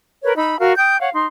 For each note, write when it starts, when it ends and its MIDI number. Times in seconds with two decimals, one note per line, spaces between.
0.24 0.35 70
0.24 0.35 71
0.24 0.35 73
0.37 0.58 63
0.37 0.58 83
0.37 0.58 88
0.59 0.74 66
0.59 0.74 70
0.59 0.74 77
0.77 1.00 79
0.77 1.00 87
0.77 1.00 91
1.00 1.10 73
1.00 1.10 77
1.00 1.10 78
1.13 1.27 63
1.13 1.27 84